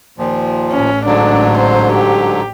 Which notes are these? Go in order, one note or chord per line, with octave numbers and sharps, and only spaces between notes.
D#2 A#2 F3
A1 A2 C#4
G#2 D3 F#3 D4
C5
G4